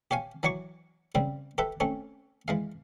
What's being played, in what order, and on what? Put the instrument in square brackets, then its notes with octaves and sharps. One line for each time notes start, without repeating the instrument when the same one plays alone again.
[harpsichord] G4 C#5 F5 G#5
E3 F#3 C#5 C#6 D6
C#3 G3 C4
G4 A4 B4 E5
A3 C4 C#4
E3 G#3 F5